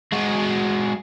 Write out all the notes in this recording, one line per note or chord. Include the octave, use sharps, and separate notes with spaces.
G#3 F#4